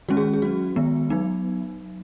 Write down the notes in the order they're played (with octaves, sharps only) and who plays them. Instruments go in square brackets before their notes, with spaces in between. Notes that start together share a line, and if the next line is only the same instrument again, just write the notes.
[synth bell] D#3 G#3 C#4 F#4
G#4
G#4
F#3 C#4 F#4
D#3 G#3 B3
F#3 B3 D#4